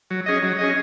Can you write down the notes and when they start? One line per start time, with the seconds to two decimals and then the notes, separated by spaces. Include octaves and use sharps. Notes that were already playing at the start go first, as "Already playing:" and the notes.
0.11 F#3
0.26 C#4 G#4 D#5
0.43 F#3
0.59 C#4 G#4 D#5